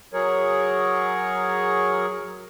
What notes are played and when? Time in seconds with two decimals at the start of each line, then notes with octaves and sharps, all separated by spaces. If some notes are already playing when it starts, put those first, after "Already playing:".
0.14 F#3 G#4 A#4 C#5